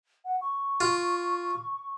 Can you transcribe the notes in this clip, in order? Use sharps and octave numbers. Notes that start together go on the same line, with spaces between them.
F#5
C#6
F4